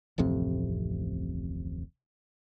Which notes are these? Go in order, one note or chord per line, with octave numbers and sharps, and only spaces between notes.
D1 A1 F2 C3